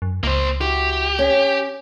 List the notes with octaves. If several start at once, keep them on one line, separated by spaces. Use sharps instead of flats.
F#2
C#2 A#3 C5
E4 F#4 G4
C#4